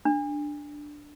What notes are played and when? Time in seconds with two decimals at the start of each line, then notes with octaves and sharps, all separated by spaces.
0.05 D4